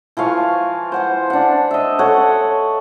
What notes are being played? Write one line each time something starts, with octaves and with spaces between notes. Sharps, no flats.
E3 F3 F5 C#6
C5 F#5 G#5
D4 F#5
D#5 E5
A4 C#5 F#5